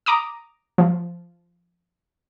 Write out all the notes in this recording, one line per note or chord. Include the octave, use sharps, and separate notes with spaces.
A#5 D6 D#6
F3